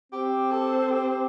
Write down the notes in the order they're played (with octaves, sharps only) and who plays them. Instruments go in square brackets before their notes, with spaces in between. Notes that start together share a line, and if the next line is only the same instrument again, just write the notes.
[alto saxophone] C4 [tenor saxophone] G4
[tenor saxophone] A4
G4